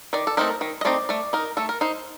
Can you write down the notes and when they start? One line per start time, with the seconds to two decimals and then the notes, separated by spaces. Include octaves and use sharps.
0.13 D#3 D5
0.27 A4
0.37 A3 C4 D#4 A#4
0.61 D#3
0.81 D#5
0.85 A3 C4 D#4 D5
1.09 A3 D5
1.33 D#4 A#4
1.57 A3 A4
1.69 A#4
1.81 D#4 C5